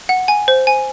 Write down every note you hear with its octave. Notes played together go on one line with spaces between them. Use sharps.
F#5
G#5
C5
G#5